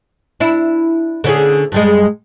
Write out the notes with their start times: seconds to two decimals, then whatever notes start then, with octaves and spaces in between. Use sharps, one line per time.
0.40 D4 E4
1.24 D3 C#4 G#4
1.72 G2 G3 G#3